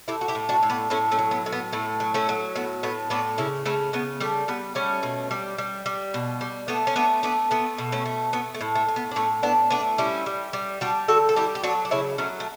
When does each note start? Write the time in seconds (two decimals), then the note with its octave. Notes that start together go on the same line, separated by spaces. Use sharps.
0.08 A2 E4 G4
0.21 F#4
0.28 E4 G4
0.35 A2
0.49 D4 F#4
0.63 A2
0.70 B3 D4
0.90 A2 A3 C#4
1.11 A3 C#4
1.19 F#3
1.31 B3
1.46 A2
1.52 B3
1.73 A2 A3
2.00 F#3
2.14 A3 C#4
2.29 F#3
2.55 A2 B3
2.83 A2 B3
3.10 A2 B3 D4
3.38 C#3 C#4 E4
3.65 C#3 A3 C#4
3.93 C#3 B3
4.20 G3 A3
4.48 G3 B3
4.75 G3 A3 C#4
5.03 B2
5.31 G3
5.58 G3
5.86 G3
6.14 B2
6.41 G3
6.68 A3 B3 D4
6.87 C#4
6.96 A3 B3 D4
7.23 A3 B3 D4
7.51 A3 B3
7.78 B2
7.92 A3 C#4
8.06 A3
8.33 A3 B3
8.55 A3
8.61 A2
8.75 A3
8.88 A2
8.96 B3
9.11 D4
9.16 A2 A3 C#4
9.43 A2 B3 D4
9.71 A3 B3 D4
9.98 G3 C#4 E4
10.26 G3
10.53 G3
10.81 G3 D4 F#4
11.08 D3 F#4 A4
11.29 A4
11.36 G3 E4 G4
11.55 G4
11.64 F#3 D4 F#4
11.85 D4
11.91 C#3 C#4 E4
12.18 F#3 A3 C#4
12.40 A3